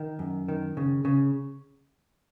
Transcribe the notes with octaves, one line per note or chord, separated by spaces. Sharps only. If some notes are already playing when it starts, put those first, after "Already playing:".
Already playing: D#3
F#2
D#3
C#3
C#3